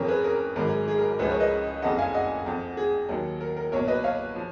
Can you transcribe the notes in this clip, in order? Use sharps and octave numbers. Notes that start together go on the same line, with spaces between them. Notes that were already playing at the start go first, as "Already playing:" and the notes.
Already playing: F2 C#3 F3 A#4 C#5
G#4 B4
A#4
A#4
G#1 G#2 F#3 A#4
G#4
G#4
A#4
A#4
C#2 C#3 F3 G#4 B4
A#4 C#5
B4 D#5
F#1 F2 C#3 D#5 F#5
F5 G#5
D#5 F#5
F2 F3
G#4
D#2 D#3 F#3
A#4
A#4
B1 A#2 F#3 A#4 C#5
B4 D#5
C#5 F5
F3